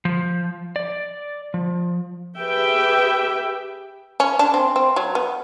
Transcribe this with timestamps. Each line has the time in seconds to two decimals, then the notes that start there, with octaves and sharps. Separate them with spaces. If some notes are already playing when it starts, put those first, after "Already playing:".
0.05 F3
0.76 D5
1.54 F3
2.39 G4 G#4 B4 E5 G5
4.20 C#4
4.39 D4
4.54 C4
4.76 C4
4.96 F#3
5.15 B3